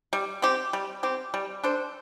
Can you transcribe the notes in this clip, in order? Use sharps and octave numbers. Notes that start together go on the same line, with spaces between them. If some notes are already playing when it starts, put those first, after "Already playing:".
G3
C4 G4
G3
C4 G4
G3
D4 A4 C5